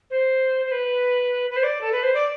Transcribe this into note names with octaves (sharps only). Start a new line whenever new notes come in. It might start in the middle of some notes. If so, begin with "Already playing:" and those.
C5
C5
B4
B4
C5
D5
A4
B4
C5
D5